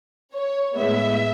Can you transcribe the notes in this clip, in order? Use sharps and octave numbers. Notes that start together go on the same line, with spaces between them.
C#5
A2 G#3 B3 E4 E5